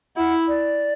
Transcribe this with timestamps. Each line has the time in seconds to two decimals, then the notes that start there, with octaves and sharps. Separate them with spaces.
0.16 E4 F#5
0.48 D5